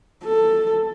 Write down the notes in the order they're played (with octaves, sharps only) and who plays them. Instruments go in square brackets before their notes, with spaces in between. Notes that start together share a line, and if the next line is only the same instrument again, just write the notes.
[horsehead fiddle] A4